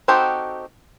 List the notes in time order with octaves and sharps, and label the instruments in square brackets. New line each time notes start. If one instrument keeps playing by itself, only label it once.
[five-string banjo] C4 D#4 F#4 G4 A4